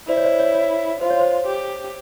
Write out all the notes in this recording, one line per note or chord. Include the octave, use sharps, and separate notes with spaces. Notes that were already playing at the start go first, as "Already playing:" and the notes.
E4 C5 D5
C#5
C5 D5
C#5
C#5
F4 C5
C#5
C5
G4